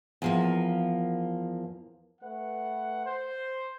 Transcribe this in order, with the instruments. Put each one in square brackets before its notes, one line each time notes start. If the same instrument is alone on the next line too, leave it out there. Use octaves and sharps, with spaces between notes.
[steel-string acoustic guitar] E2 F3 A#3
[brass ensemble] A3 B4 F#5
C5